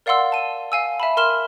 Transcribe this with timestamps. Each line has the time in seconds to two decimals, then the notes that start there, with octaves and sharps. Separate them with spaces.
0.06 A#4 D5 F5 F#5 C6 E6
0.32 A5 D#7
0.72 F5 G#5 E6
1.00 E5 A5 B5
1.17 A#4 C6 F6 E7 G7